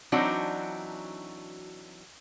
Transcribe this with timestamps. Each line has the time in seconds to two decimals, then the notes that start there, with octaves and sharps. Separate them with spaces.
0.12 E3 F#3 C4 D4 D#4 F#4